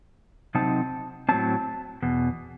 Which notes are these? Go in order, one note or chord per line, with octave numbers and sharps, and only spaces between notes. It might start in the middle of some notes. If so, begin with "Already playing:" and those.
C3 F#3 C4 D#4 A5
A2 F#3 C4 A5
E2 B2